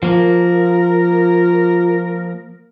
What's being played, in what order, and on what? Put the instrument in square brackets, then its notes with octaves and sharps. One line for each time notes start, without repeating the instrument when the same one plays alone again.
[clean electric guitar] F3 A#3 [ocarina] F4 [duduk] A#4